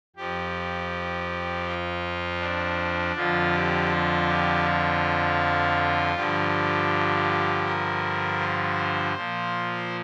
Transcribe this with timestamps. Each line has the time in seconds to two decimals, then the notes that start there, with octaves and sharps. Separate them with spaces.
0.16 F2 F3 G4
1.67 F4
2.40 D4
3.15 F2 D3 F3 F4
3.53 G4
3.91 F4
4.27 G4
4.65 F4
6.15 G2 D3 F3 G4
7.65 A#4
8.39 C5
9.14 A#2 F3